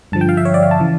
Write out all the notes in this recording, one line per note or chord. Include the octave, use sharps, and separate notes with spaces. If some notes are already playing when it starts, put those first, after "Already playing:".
G2 D3 F3 A5
G5
F5
E5
C#5
D5
F5
A5
C#3 E3